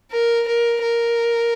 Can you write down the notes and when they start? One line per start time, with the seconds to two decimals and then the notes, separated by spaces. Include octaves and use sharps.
0.12 A#4
0.47 A#4
0.82 A#4